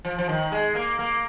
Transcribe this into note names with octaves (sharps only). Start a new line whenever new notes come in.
F3
F3
D#3
G#3
A#3
A#3